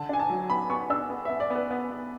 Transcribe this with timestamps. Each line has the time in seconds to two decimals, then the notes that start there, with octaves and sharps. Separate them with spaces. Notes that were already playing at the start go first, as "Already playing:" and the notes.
Already playing: D3 A5
0.09 D4 G#5
0.19 A5
0.30 F#3
0.50 B3 B5
0.70 B3 C#6
0.90 D4 E6
1.10 B3
1.25 B3 E5
1.40 D5
1.50 B3
1.55 B4
1.71 B3
1.91 B3